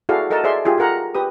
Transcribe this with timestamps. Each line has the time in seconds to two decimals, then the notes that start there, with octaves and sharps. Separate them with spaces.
0.09 E4 F#4 G#4 A4 D5 F5
0.30 A4 A#4 D#5 F#5 A5
0.44 G#4 C5 D5 E5 C6
0.65 F4 G4 G#4
0.78 F4 A4 A#4 F#5 A#5
1.15 G4 B4 D#6